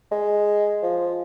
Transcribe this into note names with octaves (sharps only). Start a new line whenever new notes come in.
G#3
F3